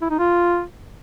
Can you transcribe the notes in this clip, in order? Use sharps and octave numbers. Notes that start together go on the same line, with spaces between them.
E4
D#4
F4